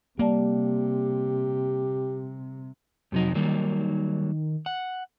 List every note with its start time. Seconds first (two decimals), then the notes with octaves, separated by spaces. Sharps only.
0.19 C3 G3 A#3 G4 D5 A5
3.12 F2 C3 F#3 D#4
3.35 D#3 F#3 G3 A#3
4.66 F#5